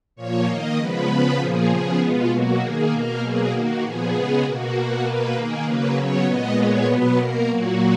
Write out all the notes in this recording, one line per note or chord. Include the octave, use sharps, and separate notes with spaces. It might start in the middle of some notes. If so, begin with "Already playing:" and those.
A#2 F3 A#3 C#5
D#3 A#3 D#5
C#3 F3 G#3 B3 B4
C#3 F3 B3
A#2 F3 A#3 G#4
C#3 F3 B3 G#4
B2 G#3 B3 F4
B2 F#3 A#3 F#4
D#3 A#3 G#4
B2 A#3 A#4
B2 F#3 A#3 G#4
D#3 A#3 F#4
A#2 F3 B3 G#4
C#3 G#3 B3 G#4
B2 A#3 F#4
B2 A#3 F#4
B2 A#3 B4
D#3 A#3 G#4
C#3 F#3 A#3 B4
C#3 F#3 B3 C#5
A#2 G#3 B3 D#5
A#2 G#3 B3 C#5
B2 F#3 B3 B4
B2 A#3 A#4
A#2 F#3 A#3 F#4